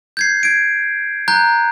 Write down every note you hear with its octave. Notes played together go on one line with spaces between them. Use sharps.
G6 G#6 C7
G#6 D7
A#5 F#6 G6